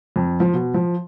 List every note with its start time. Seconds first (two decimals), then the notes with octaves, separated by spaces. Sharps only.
0.16 F2
0.40 F3
0.54 B2
0.74 F3